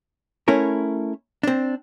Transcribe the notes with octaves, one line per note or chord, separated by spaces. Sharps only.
A3 C#4 E4 A#4
C4 D4